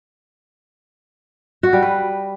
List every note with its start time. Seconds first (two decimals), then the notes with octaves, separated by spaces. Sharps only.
1.63 F#4
1.73 G3
1.82 B4